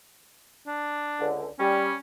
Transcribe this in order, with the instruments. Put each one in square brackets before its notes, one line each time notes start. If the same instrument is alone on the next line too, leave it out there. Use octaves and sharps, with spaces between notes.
[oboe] D4
[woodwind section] C#2 D3
[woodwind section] G3 [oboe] C#4